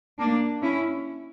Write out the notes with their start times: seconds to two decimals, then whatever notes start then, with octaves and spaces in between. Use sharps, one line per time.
0.18 A#3 D4
0.61 C#4 E4